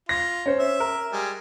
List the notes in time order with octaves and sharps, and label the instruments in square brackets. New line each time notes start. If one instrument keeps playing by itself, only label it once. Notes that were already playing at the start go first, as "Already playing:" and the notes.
[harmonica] F4 [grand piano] A#6
[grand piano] C#4 C5
[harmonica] E5
[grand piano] A#4
[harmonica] G3 G#3